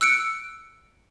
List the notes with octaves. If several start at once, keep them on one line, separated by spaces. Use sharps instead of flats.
E6 F#6 C#7 D7